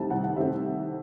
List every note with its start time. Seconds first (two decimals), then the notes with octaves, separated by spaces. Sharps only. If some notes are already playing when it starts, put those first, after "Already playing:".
Already playing: C2 C3 D#3 A3 C4 A5
0.10 C2 F#5
0.24 F#5
0.36 C3 D#3 A3 C4 E5